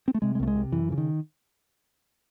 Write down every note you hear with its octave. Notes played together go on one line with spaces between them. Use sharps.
C4
A3
C3 G#3
G#3
C2 A3
G#3
C3
F#2 E3
C#3 E3
D#3